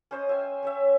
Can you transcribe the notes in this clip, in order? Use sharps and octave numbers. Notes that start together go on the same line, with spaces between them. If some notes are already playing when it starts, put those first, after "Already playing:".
C#4 C5 D#5
E5 G5 G#5
C#4 C#5 E5